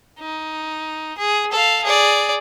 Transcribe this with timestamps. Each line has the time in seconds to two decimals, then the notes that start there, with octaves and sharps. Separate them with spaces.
0.19 D#4
1.18 G#4
1.52 A4 F5
1.84 G#4 D5